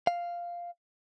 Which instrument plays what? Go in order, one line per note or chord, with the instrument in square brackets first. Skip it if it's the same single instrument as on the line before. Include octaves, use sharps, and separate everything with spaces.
[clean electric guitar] F5